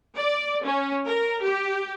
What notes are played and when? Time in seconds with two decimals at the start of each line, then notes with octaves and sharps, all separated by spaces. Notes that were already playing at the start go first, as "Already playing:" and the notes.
0.16 D5
0.63 C#4
1.06 A#4
1.42 G4